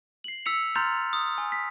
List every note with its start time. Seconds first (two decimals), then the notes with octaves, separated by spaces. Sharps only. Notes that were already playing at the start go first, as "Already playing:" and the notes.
0.24 C7 F#7
0.46 E6 B6 C#7 F7
0.75 A#5 C6 F6 G6 A6 F7
1.13 D#6
1.38 G#5
1.52 B6